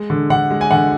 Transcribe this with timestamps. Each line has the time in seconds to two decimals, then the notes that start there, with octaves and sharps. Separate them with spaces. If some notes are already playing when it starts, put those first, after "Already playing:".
Already playing: G#3
0.10 D3
0.30 D3 F#5
0.51 G#3
0.61 G#5
0.71 D3 F#5